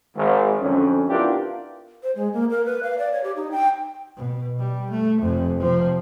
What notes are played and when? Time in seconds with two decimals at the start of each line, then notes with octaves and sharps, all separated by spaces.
0.16 G#1
0.61 F2 D3 F#3 C#4
1.09 B3 D4 E4 F4 G4 A#4
2.03 C5
2.16 G#3
2.34 A#3
2.50 A#4
2.65 B4
2.83 F5
2.98 D5
3.12 C#5
3.24 G4
3.36 D#4
3.51 G5
4.16 B2
4.59 G3
4.90 A3
5.21 F1 F2
5.60 C3 F3